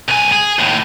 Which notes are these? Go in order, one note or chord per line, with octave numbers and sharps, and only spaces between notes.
C2 G#5
G#4
D#2 A2